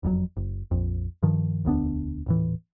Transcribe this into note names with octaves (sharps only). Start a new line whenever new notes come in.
F#1 F2 A2 F#3
F#1
A#1 F2
G2 D#3 F3
E1 D2 B3 D4
D#1 A2 E3